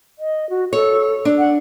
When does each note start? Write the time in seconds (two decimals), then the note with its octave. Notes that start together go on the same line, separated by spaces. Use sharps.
0.19 D#5
0.50 F#4
0.73 A4 C#5
1.25 D4
1.38 F#5